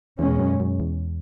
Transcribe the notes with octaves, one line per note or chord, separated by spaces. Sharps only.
E2 B2 G#3 C#4
F#2
F#2
E2